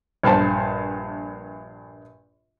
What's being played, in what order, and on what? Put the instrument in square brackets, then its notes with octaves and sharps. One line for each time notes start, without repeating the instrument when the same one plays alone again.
[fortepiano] A#1 G2 C5 A5